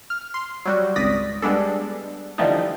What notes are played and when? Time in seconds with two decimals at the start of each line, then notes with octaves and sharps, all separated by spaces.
0.10 F6
0.34 C6
0.66 F#3 G3 F#4
0.96 G#1 C#2 D5 D#6 A#6 B6
1.42 G3 G#3 B3 D4 A4
2.38 D3 E3 F3 G3 A3 D#4